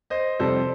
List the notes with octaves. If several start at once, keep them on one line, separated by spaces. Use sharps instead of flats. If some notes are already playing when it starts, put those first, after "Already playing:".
C5 D#5
F2 C3 G3 A4 C5